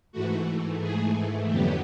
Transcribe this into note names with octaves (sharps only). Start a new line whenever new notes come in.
G#2 E3 A3 F#4
G#4
F2 D3 F#3 B3 G4